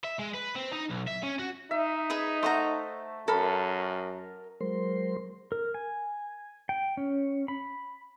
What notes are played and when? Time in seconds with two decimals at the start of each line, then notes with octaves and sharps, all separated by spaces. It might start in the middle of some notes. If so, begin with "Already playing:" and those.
0.04 E5
0.19 G#3
0.34 B4
0.55 C4
0.73 D#4
0.90 B1
1.07 E5
1.23 C#4
1.39 F#4
1.71 D#4 E5
2.10 G#4 B4
2.43 A3 C5 F#5 A#5
3.28 F#2 A4 A#4 B5
4.61 F#3 G#3 A#4 C5 C6
5.52 A#4
5.74 G#5
6.69 G5
6.97 C#4
7.48 B5